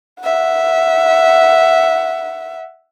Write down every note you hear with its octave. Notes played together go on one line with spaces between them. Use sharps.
E5 F#5